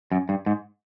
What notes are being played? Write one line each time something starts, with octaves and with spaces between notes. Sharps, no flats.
F#2
G2
G#2